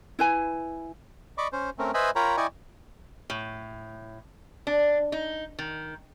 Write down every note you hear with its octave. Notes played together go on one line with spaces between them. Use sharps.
E4 B4 G#5
D5 D#5 B5 C#6 D6
C#4 C5
A3 C4 C#4 A#4
B4 C5 D#5 E5 G#5 B5
F4 A#4 C#5 G5 A#5 B5
E4 D5 D#5 G5 G#5 C#6
A2
D4
D#4
D#3